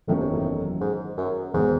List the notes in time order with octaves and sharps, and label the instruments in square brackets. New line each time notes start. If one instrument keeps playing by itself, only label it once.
[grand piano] F#1 E2 D#3 F#3 C#4 [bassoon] A2
[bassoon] C3
A2
G#2
F#2
[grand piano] E1 D#3 [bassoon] G#2